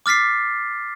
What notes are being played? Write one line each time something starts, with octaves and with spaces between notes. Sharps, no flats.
D6 F6 A6 B6 C7